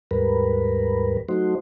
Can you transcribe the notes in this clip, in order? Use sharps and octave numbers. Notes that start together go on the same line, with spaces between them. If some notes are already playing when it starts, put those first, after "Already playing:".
D#2 G#2 G3 A#4 B4
F#3 A3 D#4 F#4 C5